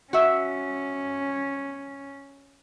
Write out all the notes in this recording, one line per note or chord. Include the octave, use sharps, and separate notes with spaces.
C#4 F#4 E5